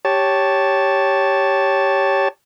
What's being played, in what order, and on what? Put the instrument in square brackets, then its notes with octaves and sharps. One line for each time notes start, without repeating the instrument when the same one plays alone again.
[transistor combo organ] G4 C#5 A5